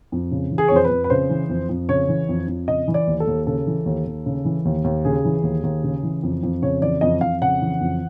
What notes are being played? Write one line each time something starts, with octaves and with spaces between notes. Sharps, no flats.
F2
C#3
E3
G#4
C#5
F2 C5
B4
F2
B4
C#3 C5
E3
F2
F2
C#3 C#5
E3
F2
F2
C#3 D#5
E3
D5
D#2
A4
D#2
C#3 A4
E3
D#2
D#2
C#3
E3
D#2
D#2
C#3 G#4
E3
D#2
D#2
C#3
E3
F2
F2
C#3 C#5
E3 D5
F2 D#5
F2 F5
C#3 F#5
E3
F2